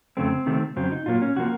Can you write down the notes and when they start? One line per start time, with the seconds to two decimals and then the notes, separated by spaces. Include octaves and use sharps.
0.17 F2 C#3 A3 C4
0.46 C3 D#3 A3
0.76 F2 C#3 F#3 C4
0.92 D#4
1.06 A#2 F#3 A#3 F4
1.22 C#4
1.35 C3 F3 A#3 F#4